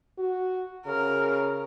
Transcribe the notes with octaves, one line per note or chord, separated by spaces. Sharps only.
F#4
C#3 A#4